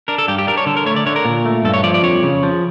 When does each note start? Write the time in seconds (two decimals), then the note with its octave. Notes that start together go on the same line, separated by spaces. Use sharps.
0.08 D4 A#4
0.18 A4
0.28 G2 G4
0.38 G4
0.47 D4 A#4
0.57 C#5
0.66 D3 A4
0.77 A#4
0.86 A3 C#5
0.96 D5
1.06 D3 C#5
1.16 A#4
1.25 A#2
1.45 A3
1.65 G2 A4
1.74 C#5
1.83 F3 D5
1.94 D5
2.03 F2 C#5
2.23 C#3
2.43 F3